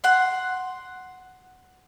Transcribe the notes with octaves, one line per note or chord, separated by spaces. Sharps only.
F#5 C6